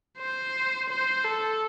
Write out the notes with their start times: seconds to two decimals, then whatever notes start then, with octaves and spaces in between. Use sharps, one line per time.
0.18 C5
0.90 C5
1.25 A4